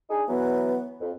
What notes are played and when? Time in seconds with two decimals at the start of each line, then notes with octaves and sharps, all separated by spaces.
0.10 D4 D#4 G#4
0.28 E3 F#3 B3
1.01 F2